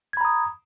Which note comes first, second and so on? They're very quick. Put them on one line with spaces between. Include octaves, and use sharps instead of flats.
G#6 B5 A#5 D#6